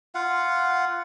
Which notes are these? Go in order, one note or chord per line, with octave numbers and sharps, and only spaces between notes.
F4 F5 F#5